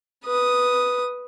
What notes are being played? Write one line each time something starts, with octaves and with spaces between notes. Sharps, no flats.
B4 D#6